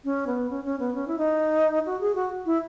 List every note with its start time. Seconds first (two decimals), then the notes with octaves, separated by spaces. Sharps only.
0.04 C#4
0.27 B3
0.50 C#4
0.65 C#4
0.79 B3
0.95 C#4
1.08 E4
1.18 D#4
1.86 F#4
2.01 G#4
2.15 F#4
2.46 E4